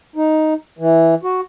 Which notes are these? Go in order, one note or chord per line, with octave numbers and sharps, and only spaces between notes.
D#4
E3
F#4